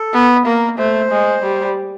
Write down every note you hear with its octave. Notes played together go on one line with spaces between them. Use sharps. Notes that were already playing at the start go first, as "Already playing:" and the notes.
Already playing: A4
B3
A#3 A#4
A3 C5
G#3
G3